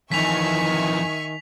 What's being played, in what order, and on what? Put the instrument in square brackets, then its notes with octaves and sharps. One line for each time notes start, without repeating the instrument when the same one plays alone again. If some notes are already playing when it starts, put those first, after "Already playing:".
[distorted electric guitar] F2 E3 [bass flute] D#3 [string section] E5 G#5 C#6 [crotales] B6 F7